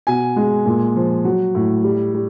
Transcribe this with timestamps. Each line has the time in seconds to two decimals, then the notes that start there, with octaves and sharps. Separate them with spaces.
0.07 B2 G#5
0.36 G#3
0.66 A#2
0.96 F3
1.25 F#3
1.55 A2
1.84 G3
2.14 G3